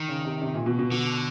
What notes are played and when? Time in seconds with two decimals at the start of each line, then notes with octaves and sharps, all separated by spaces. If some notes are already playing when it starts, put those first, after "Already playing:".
Already playing: D#3
0.09 C#3
0.25 C3
0.42 C3
0.54 A#2
0.66 B2
0.79 B2
0.91 D3